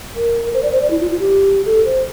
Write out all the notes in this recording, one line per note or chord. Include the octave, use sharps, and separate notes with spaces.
A#4
C5
D5
C5
D5
E4
F4
F4
G4
A4
C5